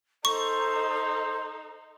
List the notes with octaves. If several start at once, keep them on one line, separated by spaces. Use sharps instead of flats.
D#4 A4 C5 C#6